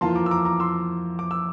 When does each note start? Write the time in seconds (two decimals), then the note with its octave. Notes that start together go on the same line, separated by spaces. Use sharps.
0.01 F2 E3 A#3 F4 A5 C6
0.16 A#5 D6
0.26 E6
0.31 A#5 D6
0.45 A#5 D6
0.60 C6 E6
1.19 D6
1.31 E6